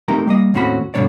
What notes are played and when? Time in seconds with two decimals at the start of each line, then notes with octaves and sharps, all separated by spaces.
0.08 A3 C4 D#4 G4 A#4 A#5
0.27 G3 A#3 D#5
0.54 D#2 A2 C4 C#4 F#4 B5
0.94 G2 B2 D3 B3 C#5 D5